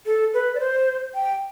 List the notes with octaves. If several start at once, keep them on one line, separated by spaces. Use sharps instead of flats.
A4
B4
D5
C5
G5